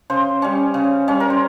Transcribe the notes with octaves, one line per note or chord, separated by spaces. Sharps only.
C#3 C5
G3 C#4
C#3
G3 C#4
A#4
C5